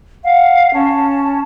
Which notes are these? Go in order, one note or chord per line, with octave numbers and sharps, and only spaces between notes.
F5 F#5
C#4 A5